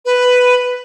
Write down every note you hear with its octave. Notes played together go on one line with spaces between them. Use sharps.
B4